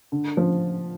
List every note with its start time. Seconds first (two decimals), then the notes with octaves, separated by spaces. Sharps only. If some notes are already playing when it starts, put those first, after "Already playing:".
0.12 D3
0.37 F3